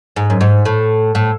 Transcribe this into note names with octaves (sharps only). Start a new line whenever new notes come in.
G#2
F#2
G#2
A2
A2